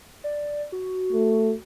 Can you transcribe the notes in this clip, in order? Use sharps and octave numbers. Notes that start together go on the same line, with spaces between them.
D5
F#4
A3